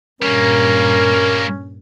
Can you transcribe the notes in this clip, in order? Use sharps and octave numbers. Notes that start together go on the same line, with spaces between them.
G2 A#2 G3 A#3 C#4 A#4